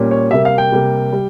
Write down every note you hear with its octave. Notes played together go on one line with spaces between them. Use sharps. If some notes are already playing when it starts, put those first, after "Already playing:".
Already playing: A#2 G3 A#3 C#4
C#5
C3 G3 A#3 E5
F5
G5
C3 G3 A#3
G3